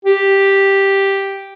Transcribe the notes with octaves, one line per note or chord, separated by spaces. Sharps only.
G4